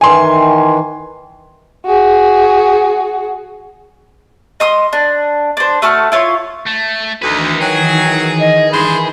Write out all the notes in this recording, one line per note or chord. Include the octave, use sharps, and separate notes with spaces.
D#3 E3 G#5 C6
F#4 G#4
D#5 C6 D#6
D4
D4 C5
A3 F#4 A5 F6
E4 F4 C#5
A3
D2 D#3 E3 D#4 B4
F#3 G#4 G5
D#5
G2 G#3 C5 B5